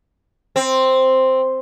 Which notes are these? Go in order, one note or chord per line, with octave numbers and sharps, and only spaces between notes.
C4